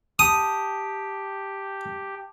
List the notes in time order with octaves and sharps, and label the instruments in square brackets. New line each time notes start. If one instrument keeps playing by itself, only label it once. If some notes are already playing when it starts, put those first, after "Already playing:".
[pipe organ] G4 [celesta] A5 [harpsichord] D#6